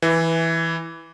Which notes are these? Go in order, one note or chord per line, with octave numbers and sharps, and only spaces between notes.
E3